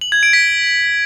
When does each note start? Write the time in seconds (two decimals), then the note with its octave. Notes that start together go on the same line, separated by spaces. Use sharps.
0.01 F#7
0.12 G#6
0.23 D7
0.33 B6